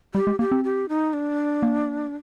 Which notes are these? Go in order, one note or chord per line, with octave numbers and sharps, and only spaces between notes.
G3 G4
G#3
A#3 G4
C4
G4
D#4
D4
A#3